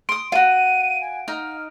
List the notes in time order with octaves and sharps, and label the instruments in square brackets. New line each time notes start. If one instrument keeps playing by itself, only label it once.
[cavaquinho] C6 D#6 [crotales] D7
[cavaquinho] F4 F#4 [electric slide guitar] F5 F#5 A#5 [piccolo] D#7
[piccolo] G#5
[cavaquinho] D#4 [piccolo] F6